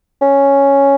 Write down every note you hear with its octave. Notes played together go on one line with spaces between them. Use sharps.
C#4